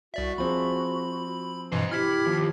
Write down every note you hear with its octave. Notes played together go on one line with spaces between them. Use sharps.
C2 F#4 D5 E5
F3 C4 G#4 B5
G2 B2 E3 C5 D#5
E4 G4 F6 G#6 B6
D#2 F3